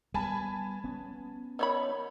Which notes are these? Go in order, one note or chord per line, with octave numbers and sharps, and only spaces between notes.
G3 B3 G#5 A5 B5
B3 C#4
D#3 C#5 B5